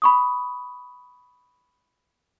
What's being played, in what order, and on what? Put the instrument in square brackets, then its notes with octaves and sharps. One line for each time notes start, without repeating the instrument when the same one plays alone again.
[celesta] B5 C#6 D#6